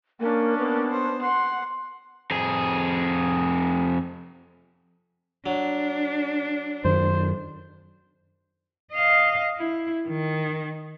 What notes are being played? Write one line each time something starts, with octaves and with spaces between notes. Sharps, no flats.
A#3 C#4 D4
A#3 B3
C5
F#5 C6
F2 G#4
F#3 D4
F#2 D#3 C5
D#5 F5
E4
D#3